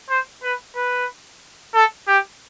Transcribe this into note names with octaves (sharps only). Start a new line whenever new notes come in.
C5
B4
B4
A4
G4